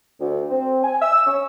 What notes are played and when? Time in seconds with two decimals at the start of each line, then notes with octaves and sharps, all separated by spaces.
0.20 D2
0.50 C4
0.84 G#5
1.02 E6
1.27 C#4